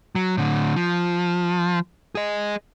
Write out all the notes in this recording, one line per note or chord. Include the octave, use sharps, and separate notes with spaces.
F#3
A2 D3
F3
G#4 D#5